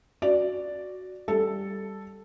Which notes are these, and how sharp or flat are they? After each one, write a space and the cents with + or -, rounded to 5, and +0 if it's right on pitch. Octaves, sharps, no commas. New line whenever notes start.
F#4 +0 D5 +0
G3 +0 A4 +0